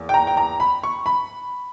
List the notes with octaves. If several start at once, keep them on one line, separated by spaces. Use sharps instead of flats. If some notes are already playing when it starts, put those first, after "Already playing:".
Already playing: E2 A#3
G5
A#5
G5
A#5
B5
C#6
B5